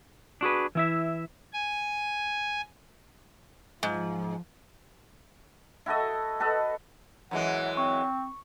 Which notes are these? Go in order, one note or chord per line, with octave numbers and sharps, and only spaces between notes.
D4 F#4 G#4 B4
E3 E4 E5
G#5
G#2 F3
E4 F#4 A4 D#5
F#4 A4 B4 D#5
F#2 E3 G#3 F#5
C4 C#6